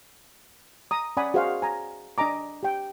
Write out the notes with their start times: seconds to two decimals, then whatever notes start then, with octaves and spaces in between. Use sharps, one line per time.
0.91 A#5 D#6
1.17 C#4 D5 F#5 G#5 B5 D#6
1.34 F#4 G#4 C5 D#5 F5 F#5
1.62 G#5 A#5
2.18 D4 D#5 G#5 A#5 D6
2.63 G4 G5